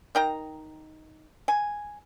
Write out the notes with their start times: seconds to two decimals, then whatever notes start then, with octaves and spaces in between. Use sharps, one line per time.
0.15 D#3 G5 A#5
1.48 G#5